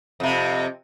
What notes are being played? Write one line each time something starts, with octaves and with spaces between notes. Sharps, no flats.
F2 C3